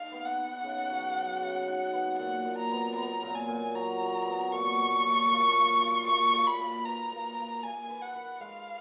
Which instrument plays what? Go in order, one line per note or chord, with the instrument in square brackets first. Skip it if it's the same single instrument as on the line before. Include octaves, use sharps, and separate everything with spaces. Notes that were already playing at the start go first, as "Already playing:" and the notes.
Already playing: [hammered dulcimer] D#4 [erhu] F5
[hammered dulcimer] B3
[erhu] F#5
[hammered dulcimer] D#4
C#3
F#3
F#3
C#3
D#4
B3
[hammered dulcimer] A#2 [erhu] F#5
[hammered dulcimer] A#2
[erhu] A#5
[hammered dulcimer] B3
[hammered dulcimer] B3 [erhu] A#5
[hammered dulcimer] A#2
[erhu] G#5
[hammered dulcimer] A#2
[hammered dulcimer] F#3 [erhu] A#5
[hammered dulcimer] F#3
B3
[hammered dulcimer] A#2 [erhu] C#6
[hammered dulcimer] A#2
A#2
A#3
A#3
F4
[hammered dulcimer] A#3 [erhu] C#6
[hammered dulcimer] A#3
[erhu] B5
[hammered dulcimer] A#3
[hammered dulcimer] B4 [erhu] A#5
[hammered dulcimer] A#3
A#3
[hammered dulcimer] A#3 [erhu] G#5
[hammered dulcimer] B4
[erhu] F#5
[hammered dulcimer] B4
[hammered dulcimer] G#3 [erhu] F5